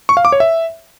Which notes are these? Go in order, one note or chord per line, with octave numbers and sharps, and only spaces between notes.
C#6
F5
D6
C#5
E5